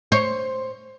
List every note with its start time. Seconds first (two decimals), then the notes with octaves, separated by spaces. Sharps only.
0.12 C5 C#5